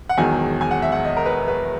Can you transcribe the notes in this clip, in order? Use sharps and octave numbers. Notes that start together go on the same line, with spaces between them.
F#5
E1 E2 D#3 F#3 G#5
G#5
F#5
E5
F#5
D#5
A#4
B4
B4